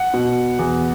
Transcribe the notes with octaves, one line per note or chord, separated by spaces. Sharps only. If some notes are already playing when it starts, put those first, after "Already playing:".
Already playing: F#5
B2
E2